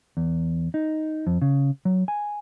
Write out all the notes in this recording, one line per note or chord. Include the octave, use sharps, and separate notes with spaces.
E2
D#4
F2
C#3
F#3
G#5